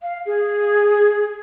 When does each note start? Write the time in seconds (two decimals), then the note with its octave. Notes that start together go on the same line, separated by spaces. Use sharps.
0.01 F5
0.26 G#4